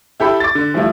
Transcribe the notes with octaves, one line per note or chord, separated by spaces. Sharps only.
E4 G4 A4 B5
D6 A6
D3
E3 F3 G3 A3 E4 F4